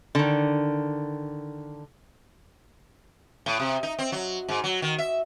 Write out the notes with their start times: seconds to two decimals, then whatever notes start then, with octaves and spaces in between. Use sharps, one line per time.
0.15 D3 D#3
3.46 A2
3.60 C3
3.83 D#4
3.99 C4
4.12 F#3
4.49 G#2
4.64 F#3
4.82 D#3
4.98 E5